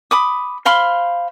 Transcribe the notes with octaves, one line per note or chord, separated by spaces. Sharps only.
B5 D6 D#6
C5 F5 B5 C6